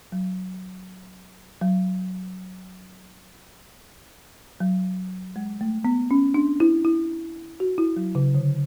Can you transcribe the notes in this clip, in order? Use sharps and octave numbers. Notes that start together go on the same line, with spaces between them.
F#3
F#3
F#3
G#3
A3
B3
C#4
D4
E4
E4
F#4
E4
F#3
C#3
D3